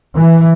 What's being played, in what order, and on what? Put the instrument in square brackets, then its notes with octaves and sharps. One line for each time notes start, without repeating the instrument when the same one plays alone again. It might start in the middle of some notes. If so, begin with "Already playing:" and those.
[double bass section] E3